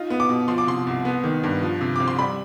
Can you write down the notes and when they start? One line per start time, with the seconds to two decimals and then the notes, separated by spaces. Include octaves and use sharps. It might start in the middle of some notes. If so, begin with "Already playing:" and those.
Already playing: D#4 F4
0.10 B3
0.20 D6
0.29 B2
0.48 F3 C6
0.58 D6
0.67 C3 C6
0.87 C2
1.05 B3
1.24 D#3
1.43 G2
1.62 F3
1.81 C3
1.96 C4 D6
2.08 C6
2.19 G3 B5